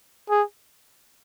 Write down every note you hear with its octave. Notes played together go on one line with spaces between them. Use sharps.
G#4